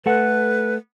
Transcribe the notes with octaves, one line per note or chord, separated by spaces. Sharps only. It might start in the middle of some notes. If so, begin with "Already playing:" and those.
A3 A4 B4 F#5